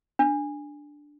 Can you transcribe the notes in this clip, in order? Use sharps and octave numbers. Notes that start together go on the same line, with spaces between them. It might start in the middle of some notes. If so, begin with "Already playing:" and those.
D4